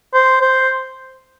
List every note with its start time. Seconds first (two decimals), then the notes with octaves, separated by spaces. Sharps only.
0.14 C5
0.42 C5